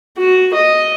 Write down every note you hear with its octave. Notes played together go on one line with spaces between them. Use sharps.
F#4
D#5